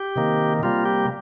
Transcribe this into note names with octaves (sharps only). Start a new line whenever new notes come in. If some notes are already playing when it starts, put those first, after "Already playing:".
Already playing: G4
C3 D#3 A#3
C3 G3 A#3 F4
G4